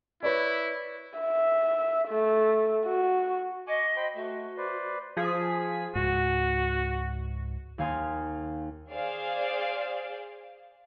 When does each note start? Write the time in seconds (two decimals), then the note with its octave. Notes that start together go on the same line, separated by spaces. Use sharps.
0.23 E4 B4 C#5 D5
1.19 E5
2.08 A3
2.86 F#4
3.67 D#5 G#5 C#6 D6
3.97 C5 G5 B5
4.16 A3 F#4
4.57 B4 C5 D5
5.17 F3 G#4 B6
5.95 C#2 G#2 F#4
7.78 D#2 A#3 F5 G#5 C6 D#6
8.93 G#4 C5 D5 F5